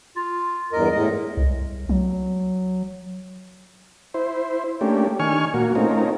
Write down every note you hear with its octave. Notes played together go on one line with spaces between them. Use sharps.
F4
E2 G2 A#4 D#5
A2 G#3 D#5
C2
F#3
E4 C5
A3 A#3 C#4 D4 G4
D#3 D4 G#5 C#6 F6
A#2 A#3 F#4
A3 C4 C#4 D#4 F4 A#4